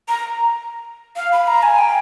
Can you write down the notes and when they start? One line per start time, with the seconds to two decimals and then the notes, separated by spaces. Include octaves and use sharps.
0.08 A#5
1.16 F5
1.32 B5
1.47 A#5
1.63 G#5
1.79 G5